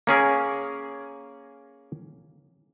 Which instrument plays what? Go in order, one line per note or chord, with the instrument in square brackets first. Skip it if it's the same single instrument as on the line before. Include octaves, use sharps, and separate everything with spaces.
[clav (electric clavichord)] A#3 C#4 G#4 A#4